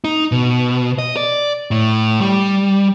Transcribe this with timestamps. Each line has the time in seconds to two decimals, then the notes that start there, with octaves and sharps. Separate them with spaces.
0.04 D#4
0.32 B2
0.99 D#5
1.17 D5
1.71 A2
2.21 G3